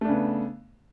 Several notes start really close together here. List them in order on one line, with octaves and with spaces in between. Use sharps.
A3 D4 C#3 B3